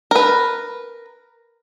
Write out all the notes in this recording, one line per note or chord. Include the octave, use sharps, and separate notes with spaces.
A#4 B4